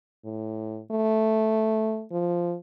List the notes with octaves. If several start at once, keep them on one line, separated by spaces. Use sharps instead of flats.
A2
A3
F3